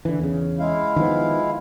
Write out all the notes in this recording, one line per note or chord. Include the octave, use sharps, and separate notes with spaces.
D3 E3
E2 C#3
G#3 E4 F5
D#3 F3 B3